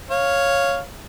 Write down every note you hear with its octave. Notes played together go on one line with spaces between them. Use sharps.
C#5 F5